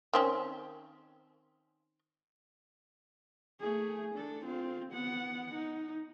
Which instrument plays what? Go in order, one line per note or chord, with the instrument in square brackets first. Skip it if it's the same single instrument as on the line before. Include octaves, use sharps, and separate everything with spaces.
[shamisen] D#3 C4 C#4
[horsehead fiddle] A3 G#4
D4 A4
C4 F4
B3 F#5
D#4